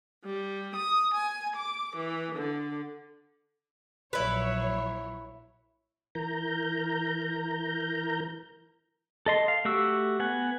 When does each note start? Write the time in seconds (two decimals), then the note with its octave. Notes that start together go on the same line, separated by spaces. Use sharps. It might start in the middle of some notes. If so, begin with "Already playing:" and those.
0.24 G3
0.75 D#6
1.14 G#5
1.56 D6
1.96 E3
2.34 D3
4.13 A#1 F#3 E4 B4 C#5
6.15 E3 A#4 A#5 G6
9.26 A4 D#5 C6
9.48 F5
9.65 A3 F#4 G4 E6
10.20 B3 F#5 G#5